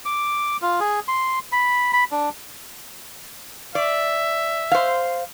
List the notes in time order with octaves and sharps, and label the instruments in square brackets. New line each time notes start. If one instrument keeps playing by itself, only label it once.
[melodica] D6
F4
G#4
C6
B5
B5
D4
[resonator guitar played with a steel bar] D5 [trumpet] E5
[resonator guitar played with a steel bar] C5 F5